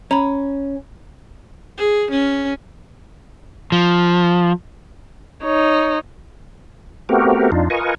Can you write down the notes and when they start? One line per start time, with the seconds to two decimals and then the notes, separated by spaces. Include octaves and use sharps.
0.11 C#4 A#5 B5
1.78 G#4
2.10 C#4
3.72 F3
5.42 D#4 C#5
7.09 A3 B3 C4 F#4 G4 A#4
7.52 F2 D4 D#4 F4
7.70 F4 A#4 B4 D#5 G#5 C#6